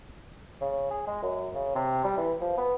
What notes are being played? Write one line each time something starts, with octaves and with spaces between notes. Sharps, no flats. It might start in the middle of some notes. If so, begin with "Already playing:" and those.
C#3
G#4
G#3
F#2
C#3
C3
G3
E3
F3
B3